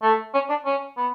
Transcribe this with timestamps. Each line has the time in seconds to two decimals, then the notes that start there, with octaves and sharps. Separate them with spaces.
0.03 A3
0.34 C#4
0.49 D4
0.66 C#4
0.97 B3